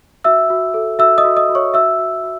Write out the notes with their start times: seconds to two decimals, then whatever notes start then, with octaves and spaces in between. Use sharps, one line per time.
0.24 F#4 E5 E6
0.50 F#4
0.74 A4
0.99 F#4 E5 E6
1.18 D#5 D#6
1.24 F#4
1.36 D#5 D#6
1.49 F#4
1.55 C#5 C#6
1.74 F#4 E5 E6
1.99 F#4
2.23 F#4